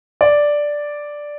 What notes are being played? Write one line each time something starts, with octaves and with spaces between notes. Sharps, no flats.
D5